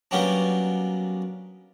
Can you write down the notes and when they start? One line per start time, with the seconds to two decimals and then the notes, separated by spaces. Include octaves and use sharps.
0.11 F#3 G3 A#3 B3 C#4 D4